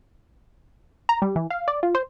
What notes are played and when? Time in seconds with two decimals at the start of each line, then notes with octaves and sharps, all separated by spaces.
1.09 A#5
1.22 G3
1.36 E3
1.50 F5
1.68 D5
1.83 F4
1.95 C5